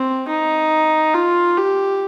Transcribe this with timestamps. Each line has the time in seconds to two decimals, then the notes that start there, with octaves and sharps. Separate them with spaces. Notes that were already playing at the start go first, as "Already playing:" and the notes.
Already playing: C4
0.28 D#4
1.14 F4
1.57 G4